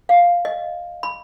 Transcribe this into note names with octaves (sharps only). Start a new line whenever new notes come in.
F5
D#5
B5